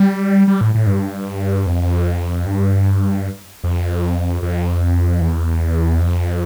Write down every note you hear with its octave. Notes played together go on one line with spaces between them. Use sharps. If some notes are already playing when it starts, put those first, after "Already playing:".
Already playing: G3
G3
A2
A2
G2
F2
G2
F2
F2
E2
F2